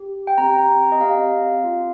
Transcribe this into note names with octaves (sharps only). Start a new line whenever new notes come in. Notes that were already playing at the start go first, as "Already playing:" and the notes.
Already playing: G4
G5
C4 G4 A#5
D#5
C4 G4 F5
C4 F4